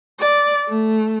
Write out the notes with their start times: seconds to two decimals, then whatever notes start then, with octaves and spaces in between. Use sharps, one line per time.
0.20 D5
0.68 A3